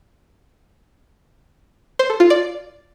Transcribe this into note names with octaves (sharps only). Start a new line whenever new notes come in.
C5
A4
F4
D5